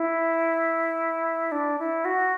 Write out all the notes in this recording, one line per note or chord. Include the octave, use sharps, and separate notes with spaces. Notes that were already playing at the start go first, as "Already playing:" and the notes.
Already playing: E4
D4
E4
F#4